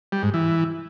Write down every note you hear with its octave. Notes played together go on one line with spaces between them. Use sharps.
G3
G#2
E3